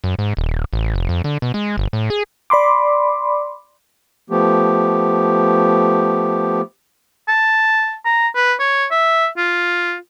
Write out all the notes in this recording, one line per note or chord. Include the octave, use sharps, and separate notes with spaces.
F#2
G#2
D#1
A1
F1
F2
D3
B2
G#3
G1
A2
G#4
D5 B5 C6 D6
F3 A3 B3 G4
A5
A#5
B4
C#5
E5
F4